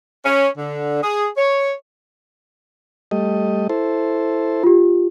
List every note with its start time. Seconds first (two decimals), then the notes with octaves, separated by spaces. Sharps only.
0.24 C#4
0.57 D3
1.02 G#4
1.37 C#5
3.11 G3 A3 D#5
3.69 E4 A4 C5
4.64 F4 G4